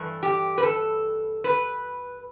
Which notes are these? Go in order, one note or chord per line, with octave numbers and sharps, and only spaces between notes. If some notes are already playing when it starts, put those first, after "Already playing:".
Already playing: G2 E3 A3
G4
B4
A4
B4